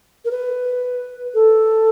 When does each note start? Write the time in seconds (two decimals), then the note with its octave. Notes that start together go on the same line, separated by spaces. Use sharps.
0.25 A#4
0.31 B4
1.34 A4